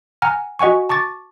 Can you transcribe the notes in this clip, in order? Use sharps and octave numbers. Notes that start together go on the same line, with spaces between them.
F#5 G#5 A#5 F6
F#4 D#5 F#5 G#5 C#6
A5 C#6 D6 A6